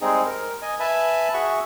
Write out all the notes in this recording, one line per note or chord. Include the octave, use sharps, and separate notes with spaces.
G3 G#3 C4 D#4 G#4
A#4
D#5 G#5
B4 E5 G#5 A5 B5
F#4 G#4 E5 F#5 C#6